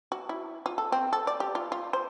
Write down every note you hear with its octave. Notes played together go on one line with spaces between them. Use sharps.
F#4
E4
F4
A4
C4
A4
D5
G4
F4
F4
C5